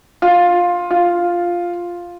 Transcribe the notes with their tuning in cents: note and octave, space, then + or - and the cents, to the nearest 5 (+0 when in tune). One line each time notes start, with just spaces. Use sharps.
F4 +10
F4 +0